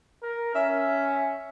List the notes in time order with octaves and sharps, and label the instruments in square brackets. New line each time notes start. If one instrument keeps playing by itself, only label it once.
[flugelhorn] A#4
[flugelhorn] C#4 [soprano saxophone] E5